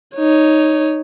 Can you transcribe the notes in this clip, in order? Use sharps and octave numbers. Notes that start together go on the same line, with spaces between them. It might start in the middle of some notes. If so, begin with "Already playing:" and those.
D#4 C#5